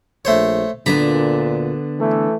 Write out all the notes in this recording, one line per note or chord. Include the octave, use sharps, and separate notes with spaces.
A#1 A3 C5 C#5
D2 A#2 D3 B3 D4 A#5 B5
E3 A3